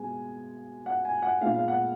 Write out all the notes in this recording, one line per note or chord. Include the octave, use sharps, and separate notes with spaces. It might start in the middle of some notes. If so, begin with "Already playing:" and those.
Already playing: B2 G#3 B3 G#5
F#5
G#5
F#5
A#2 G#3 B3 F5
F5
F#5